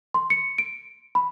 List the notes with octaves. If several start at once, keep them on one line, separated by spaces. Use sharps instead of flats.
C6
C#7
D7
B5